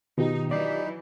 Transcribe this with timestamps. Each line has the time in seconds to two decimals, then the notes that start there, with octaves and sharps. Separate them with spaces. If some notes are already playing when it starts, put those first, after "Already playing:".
0.18 B2 D#3 D#4 F4 G4
0.51 E3 F#3 D#4 D5